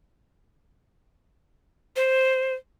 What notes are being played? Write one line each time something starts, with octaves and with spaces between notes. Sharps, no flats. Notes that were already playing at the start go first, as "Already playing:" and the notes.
C5